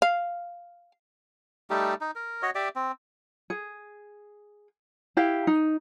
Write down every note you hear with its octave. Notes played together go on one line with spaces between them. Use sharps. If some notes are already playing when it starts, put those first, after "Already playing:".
F5
G3 A3 D#4 G4
D#4
A#4
F#4 C#5 D#5
G4 D5 E5
C4
G#4
E4 G4 F5
D#4